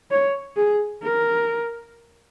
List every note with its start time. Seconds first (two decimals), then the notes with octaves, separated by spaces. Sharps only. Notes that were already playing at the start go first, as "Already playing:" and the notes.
0.11 C#5
0.56 G#4
1.03 A#4